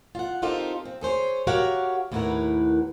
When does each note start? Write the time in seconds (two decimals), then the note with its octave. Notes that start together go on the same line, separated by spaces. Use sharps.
0.15 F4 F#5
0.42 C4 D#4 F4 G4 A4 A#4
0.85 C4
1.01 G#4 A4 C5 C#5
1.47 F#4 G4 A#4 C#5 F5 F#5
2.12 D#2 A2 E4 A#4 B4 F#5